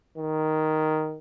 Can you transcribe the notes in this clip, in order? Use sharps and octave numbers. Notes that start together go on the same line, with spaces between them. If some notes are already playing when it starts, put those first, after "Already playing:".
D#3